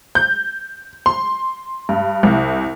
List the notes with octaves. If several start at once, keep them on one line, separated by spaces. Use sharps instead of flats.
G6
C6
G2
C2